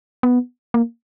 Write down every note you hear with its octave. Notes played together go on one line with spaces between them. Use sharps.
B3
A#3